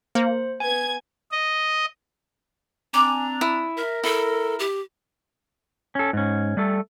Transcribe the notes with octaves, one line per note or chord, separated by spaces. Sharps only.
A#3 C5
B3 G#5 G#6
D#5
C4 D4 G#5 A#5 D6
E4 D#6
A#4 E5
E4 A4
G4
C#4 A4
G#2 C#4
G3 A3 A4